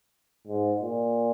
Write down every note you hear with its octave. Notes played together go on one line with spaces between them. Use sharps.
G#2
A#2